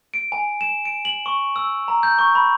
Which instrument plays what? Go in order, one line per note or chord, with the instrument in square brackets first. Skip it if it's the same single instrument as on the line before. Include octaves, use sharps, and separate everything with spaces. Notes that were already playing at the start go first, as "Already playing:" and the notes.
[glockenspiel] D7
G#5
E7
D7
F#7
C#6
E6
A#5
G6
C#6
B5